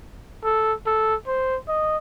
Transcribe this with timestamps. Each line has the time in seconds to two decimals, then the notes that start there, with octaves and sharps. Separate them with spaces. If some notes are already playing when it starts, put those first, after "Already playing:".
0.45 A4
0.86 A4
1.27 C5
1.69 D#5